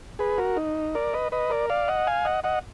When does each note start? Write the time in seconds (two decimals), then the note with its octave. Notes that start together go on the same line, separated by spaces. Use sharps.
0.19 G#4 B4
0.38 F#4 A#4
0.57 D#4
0.95 A#4 D5
1.13 B4 D#5
1.32 B4 D#5
1.50 A#4 D5
1.70 D5 F5
1.88 D#5 F#5
2.07 F5 G#5
2.25 D#5 F#5
2.44 D#5 F#5